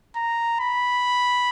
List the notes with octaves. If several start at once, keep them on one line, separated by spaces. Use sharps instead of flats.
A#5
B5